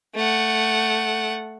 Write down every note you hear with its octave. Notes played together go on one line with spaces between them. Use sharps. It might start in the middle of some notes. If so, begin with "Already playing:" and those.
A3 F#5